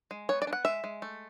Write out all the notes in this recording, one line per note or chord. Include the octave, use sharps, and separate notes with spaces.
G#3
B3 C#5
D5
D4
F#5
G#3 E5
G#3
A3